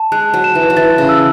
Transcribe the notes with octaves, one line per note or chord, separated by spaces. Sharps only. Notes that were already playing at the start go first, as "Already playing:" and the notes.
Already playing: A5
G#3 F#6
F#3
E7
E3
F#3
E3 A6
C#3
E6